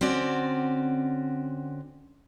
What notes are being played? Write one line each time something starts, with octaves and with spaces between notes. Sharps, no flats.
D3 C4 C#4 F#4 D5